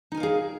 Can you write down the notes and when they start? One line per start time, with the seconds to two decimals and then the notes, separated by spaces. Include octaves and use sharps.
0.12 D#4
0.15 G#5
0.17 A#4
0.20 F5
0.23 G#4